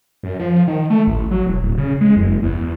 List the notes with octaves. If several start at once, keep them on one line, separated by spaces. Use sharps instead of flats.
F#2
F3
D#3
A3
A1
F#3
E1
D1
C#3
G#3
F#1
E2